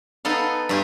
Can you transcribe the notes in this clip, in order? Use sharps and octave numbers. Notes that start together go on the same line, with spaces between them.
B3 D#4 A4 F5
G2 G4 G#5